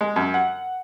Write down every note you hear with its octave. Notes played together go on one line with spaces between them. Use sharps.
G#3
F#2
F#5